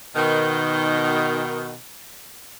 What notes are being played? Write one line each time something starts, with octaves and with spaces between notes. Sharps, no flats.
B2 D#3